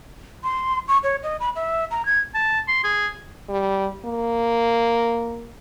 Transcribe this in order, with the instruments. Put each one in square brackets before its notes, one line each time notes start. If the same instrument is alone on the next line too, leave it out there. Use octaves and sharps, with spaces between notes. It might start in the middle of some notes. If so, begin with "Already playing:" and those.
[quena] C6
C#6
C#5
D#5
B5
E5
A#5
G#6
[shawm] A5
C6
G#4
[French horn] G3
A#3